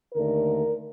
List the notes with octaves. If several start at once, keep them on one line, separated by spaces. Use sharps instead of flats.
D#2 D3 A3 A#4